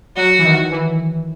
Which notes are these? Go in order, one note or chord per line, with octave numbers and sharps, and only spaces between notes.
F#3 F#4
E3
D#3
E3